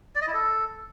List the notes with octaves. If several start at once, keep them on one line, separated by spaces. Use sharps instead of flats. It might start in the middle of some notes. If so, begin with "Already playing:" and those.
D5
D#5
E4
A4